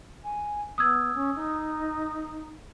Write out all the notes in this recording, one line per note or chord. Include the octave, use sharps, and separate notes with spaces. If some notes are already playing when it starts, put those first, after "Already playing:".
G#5
B3 D#6 E6 G#6
C#4
D#4